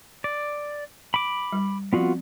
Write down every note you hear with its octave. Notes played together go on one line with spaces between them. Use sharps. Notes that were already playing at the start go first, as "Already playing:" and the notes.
D5
B5 D6
G3
F3 B3 C4 F4 F#4